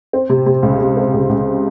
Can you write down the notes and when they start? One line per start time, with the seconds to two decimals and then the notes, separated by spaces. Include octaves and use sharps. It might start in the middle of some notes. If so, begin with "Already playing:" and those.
0.13 C4
0.30 C3
0.46 C3
0.63 C#2
0.80 C3
0.97 C4
1.14 C#2
1.29 C#2